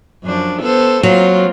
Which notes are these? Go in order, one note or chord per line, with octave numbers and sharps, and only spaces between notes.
F#2 F3 D4
B3 A4 C5
F#3 A#3 C4 F4